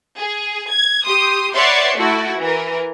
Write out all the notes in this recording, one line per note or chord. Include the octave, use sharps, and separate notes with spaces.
G#4
G#6
G4 C6 D#6
B4 C#5 D5 E5 F#5 C6
A3 E4 F#4
E3 A#4